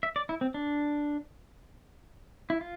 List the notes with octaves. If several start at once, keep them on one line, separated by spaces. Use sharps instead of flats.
E5
D5
E4
C4
D4
E4
F4